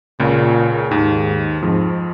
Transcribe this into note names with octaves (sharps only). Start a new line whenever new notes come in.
C#2 A#2 C#3
D#2 G#2 D#3
F2 G#2 F3